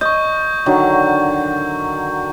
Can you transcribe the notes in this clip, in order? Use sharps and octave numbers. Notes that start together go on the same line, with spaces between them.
D#5 C#6 G6
D3 D#3 F#3